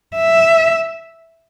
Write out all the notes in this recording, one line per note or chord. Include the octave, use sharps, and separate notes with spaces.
E5